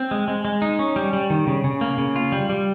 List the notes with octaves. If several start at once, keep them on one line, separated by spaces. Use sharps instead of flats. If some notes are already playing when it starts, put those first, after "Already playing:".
Already playing: C4
G#3
G#3
G#3
D#4
C#4
G3
G3
D#3
C#3
C#3
A#3
C#3
F4
G3
G3